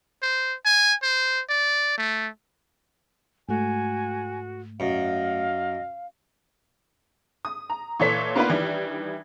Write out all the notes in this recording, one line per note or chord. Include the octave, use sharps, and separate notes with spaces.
C5
G#5
C5
D5
A3
G#2 A3 F#4 G#5
F#2 D#5 F5
D#6
A#5
A#2 E3 A4 C#5 B6
A#3 B3 D4 D#4 F4 B4
D#3 E3 G3 D4